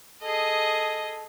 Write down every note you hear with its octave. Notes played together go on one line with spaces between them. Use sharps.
G#4 A4 D#5